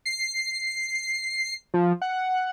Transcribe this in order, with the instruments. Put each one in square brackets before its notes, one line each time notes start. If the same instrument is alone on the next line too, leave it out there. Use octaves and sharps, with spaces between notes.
[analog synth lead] C7
F3
F#5